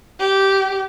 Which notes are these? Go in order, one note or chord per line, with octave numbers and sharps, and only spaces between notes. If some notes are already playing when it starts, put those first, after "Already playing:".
G4